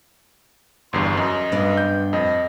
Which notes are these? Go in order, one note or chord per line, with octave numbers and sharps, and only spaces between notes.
G1 E2 G2 C6
F#2 D#5
G2 B3 D5
G6
F2 D#5